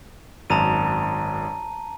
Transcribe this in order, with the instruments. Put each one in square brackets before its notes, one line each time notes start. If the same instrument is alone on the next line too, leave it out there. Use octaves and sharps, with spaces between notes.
[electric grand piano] G#1 F#2 [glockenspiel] A5 A#5 D#7